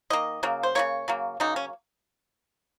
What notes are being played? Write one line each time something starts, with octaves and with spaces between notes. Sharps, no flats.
D#3 A#3 D#5
C#3 F#3 A#3
C5
C#3 F#3 A#3 C#5
C#3 F#3 A#3
C#3 F#3 A#3 D#4
C#4